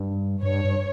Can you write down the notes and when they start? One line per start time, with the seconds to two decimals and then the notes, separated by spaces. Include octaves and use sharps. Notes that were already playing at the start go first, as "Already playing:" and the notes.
Already playing: G2
0.43 G2 C#5
0.65 G2